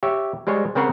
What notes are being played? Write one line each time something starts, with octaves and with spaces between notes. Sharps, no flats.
G4 C#5 E5
G3 G#3 C5 C#5
C#3 C4 A#4 C5 C#5 F#5